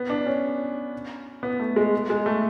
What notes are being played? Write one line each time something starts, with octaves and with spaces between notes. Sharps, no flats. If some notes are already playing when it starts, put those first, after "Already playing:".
Already playing: B3
D4
C#4
B3
A3
G#3
G#3
A3